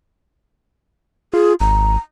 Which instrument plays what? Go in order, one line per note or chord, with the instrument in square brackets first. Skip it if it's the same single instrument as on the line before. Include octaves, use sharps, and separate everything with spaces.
[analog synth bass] F4 [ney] G#4
[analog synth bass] G#1 [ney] A#5